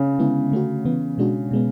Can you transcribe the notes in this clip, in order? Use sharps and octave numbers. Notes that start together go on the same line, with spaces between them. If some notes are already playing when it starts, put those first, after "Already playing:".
Already playing: C#3
D3 G#3 B3 E4
D3 A3 C#4 F#4
C#3 E3 B3
B2 G#3 D4 F#4
B2 G#3 B3